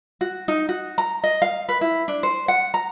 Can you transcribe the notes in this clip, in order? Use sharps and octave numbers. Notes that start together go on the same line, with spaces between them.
F#4
D#4
F#4
A#5
D#5
F5
B4
E4
D4
C5
F#5
A#5